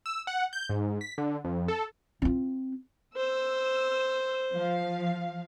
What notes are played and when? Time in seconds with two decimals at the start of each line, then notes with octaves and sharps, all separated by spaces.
0.06 E6
0.27 F#5
0.53 G6
0.70 G#2
1.01 B6
1.18 D3
1.44 F2
1.68 A4
2.22 C4 F4
3.17 C5 E6
4.52 F3 F5